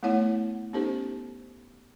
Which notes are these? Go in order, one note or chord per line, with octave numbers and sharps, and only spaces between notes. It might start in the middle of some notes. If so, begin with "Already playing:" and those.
A3 B3 E4 C#5 F#5
B3 C#4 D#4 G4 A4 C5